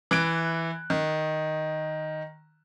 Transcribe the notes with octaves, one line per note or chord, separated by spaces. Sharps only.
E3 F#6 D7
D#3